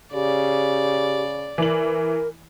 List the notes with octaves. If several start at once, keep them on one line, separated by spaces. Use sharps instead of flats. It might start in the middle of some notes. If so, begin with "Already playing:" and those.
C#3 G4 D5
E3 A#4 F#7